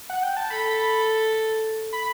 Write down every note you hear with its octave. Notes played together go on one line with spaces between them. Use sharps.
F#5
G5
A5
A4 B5
B5